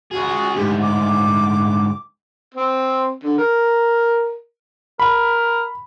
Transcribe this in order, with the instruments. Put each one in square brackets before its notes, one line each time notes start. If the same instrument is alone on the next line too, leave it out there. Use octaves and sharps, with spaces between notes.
[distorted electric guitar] C#2 G#4 [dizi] F#4
[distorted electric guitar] D2 G#2 [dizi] G4
[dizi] D6
[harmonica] C4
D3
A#4
[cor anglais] A#4 [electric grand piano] B5